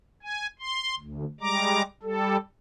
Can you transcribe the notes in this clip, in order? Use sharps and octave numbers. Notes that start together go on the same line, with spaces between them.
G#5
C6
D2
G3 G#3 A#5 D6
G3 A4